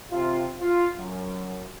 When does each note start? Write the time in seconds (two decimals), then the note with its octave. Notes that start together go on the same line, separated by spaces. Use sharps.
0.11 C3 F4
0.60 F4
0.96 F#2